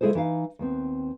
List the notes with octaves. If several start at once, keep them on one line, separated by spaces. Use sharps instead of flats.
C#3 G#3 E4 G#4 A4 C5
E3 D#4 F5
D#2 B3 C4